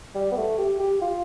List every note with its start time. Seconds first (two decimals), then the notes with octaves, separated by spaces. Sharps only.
0.15 G3
0.32 B3
0.37 A3
0.58 G4
0.79 G4
1.01 F4